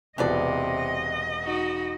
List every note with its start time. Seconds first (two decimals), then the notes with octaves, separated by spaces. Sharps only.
0.18 E1 C3 E3 F3 B3 D5 D#5
1.44 D#4 F#4